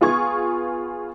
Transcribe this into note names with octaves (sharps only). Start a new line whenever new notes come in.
B3 F4 G#4 C#6 G#6